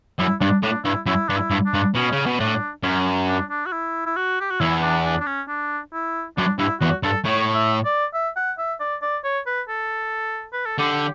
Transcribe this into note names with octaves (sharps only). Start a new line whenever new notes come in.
F#2 E4
G2 D4
A2 D4
G2 E4
F#2 E4
G2 D4
E4
G2
D4
G2
B2 C#4
C#3
B2
A2 D4
F#2 C#4
D4
D4
F#4
E4
E4
F#4
G4
F#4
E2 E4
D4
D4
D4
C#4
D4
E4
F#2 D4
G2 E4
E2 F#4
G2 A4
A2 C#5
E5
D5
E5
F#5
E5
D5
D5
C#5
B4
A4
B4
A4
D3 G4